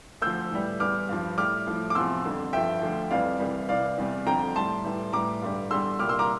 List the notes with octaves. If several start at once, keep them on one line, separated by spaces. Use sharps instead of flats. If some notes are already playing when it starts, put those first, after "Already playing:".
D2 D3 F3 E6 G6
A2 E3 G3
E2 E3 G3 D6 F6
G2 F3
A2 G3 D6 F6
A2 F3
D6
E2 C3 F3 C6 E6
F2 D3 G3
G2 D3 F3 E5 G5
D2 D3 F3
F2 E3 G3 D5 F5
C2 C3 E3 G3
C2 C3 E3 D5 F5
E2 C3 G3
F2 D3 F3 G5 A#5
A2 G3 A5 C6
A2 E3 G3
A2 E3 G3 A#5 D6
G2 D3 G3
E2 D3 G3 C6 E6
C2 A#2 G3 D6 F6
C6 E6
A#5 D6